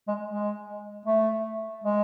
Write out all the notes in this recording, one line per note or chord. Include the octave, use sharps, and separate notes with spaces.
G#3
G#3
A3
G#3